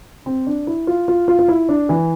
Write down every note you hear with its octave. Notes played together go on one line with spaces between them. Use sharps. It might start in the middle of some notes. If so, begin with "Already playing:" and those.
C4
D4
E4
F4
F4
F4
F4
E4
D4
E3